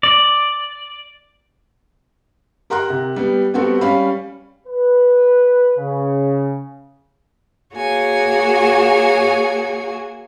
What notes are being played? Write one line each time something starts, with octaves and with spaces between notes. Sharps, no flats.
D5
G4 A#4 F#5 A#5 C6 F#6
C3
G3 B3 G4
G3 B3 C4 F#4 G4 A4
G3 C#4 F5 B5
B4
C#3
A#3 F#4 G#4 C#5 G#5